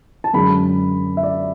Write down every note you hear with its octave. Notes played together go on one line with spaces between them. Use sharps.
A5
F#2 D3 G#3 D4 B5
E5
D5